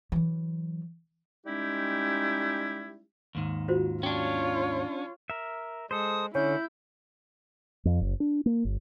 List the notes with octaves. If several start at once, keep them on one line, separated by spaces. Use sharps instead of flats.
E3 F#3
G3 G#3 C#4 D#4 E4 G4
D#2 G#2 D#3
F4 F#4 C5
C#4 D4 F4 C#5 G5 C6
A#4 E5
G#3 A4 C5 D#6
D3 C#4 E4 G6
F2
F#1
D4
A#3
G1